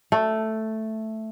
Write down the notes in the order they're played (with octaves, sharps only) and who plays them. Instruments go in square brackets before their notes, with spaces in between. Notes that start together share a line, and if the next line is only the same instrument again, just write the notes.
[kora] A3